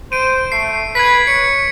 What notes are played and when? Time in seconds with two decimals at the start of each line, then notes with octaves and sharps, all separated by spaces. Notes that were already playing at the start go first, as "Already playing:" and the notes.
0.12 C5 D7 D#7
0.52 A3 C7
0.95 B4 G#6 B6
1.27 C#5 C#7